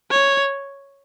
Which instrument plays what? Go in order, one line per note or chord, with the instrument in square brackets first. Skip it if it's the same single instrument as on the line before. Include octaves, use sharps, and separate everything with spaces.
[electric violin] C#5